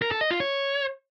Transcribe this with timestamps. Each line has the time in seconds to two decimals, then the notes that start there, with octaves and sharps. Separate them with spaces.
0.02 A#4
0.11 A4
0.21 D#5
0.31 F4
0.40 C#5